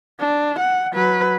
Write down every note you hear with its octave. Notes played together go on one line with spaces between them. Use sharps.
D4
F#5
F#3 B4